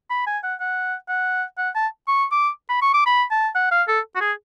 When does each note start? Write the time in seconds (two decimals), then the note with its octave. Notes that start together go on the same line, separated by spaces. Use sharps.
0.10 B5
0.27 G#5
0.43 F#5
0.60 F#5
1.08 F#5
1.58 F#5
1.75 A5
2.07 C#6
2.32 D6
2.69 B5
2.82 C#6
2.94 D6
3.06 B5
3.31 A5
3.55 F#5
3.71 F5
3.88 A4
4.15 F#4
4.21 G#4